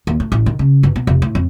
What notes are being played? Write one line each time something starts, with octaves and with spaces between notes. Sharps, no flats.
D#2
A2
A1
D#3
C#3
G1
B2
F1
A2
F2